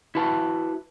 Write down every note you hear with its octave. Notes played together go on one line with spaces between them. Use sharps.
E4 F#4 B4 A5